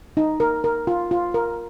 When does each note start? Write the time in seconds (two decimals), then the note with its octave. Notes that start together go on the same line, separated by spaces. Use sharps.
0.17 D#4
0.40 A#4
0.64 A#4
0.87 F4
1.11 F4
1.34 A#4